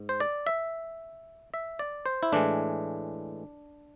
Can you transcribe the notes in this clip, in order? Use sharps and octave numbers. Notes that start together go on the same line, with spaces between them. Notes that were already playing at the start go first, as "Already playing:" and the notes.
Already playing: G#2
C5
D5
E5
E5
D5
C5
E4
A2 E3 G#3 D4